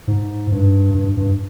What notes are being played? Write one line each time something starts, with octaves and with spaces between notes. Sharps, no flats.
G#2
G2
G2
G2